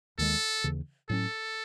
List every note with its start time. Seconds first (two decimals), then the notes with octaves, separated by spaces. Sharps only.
0.18 D#2 D#3 G#3 A4
0.64 D#2 C#3 E3
1.09 A2 F#3 C#4 A4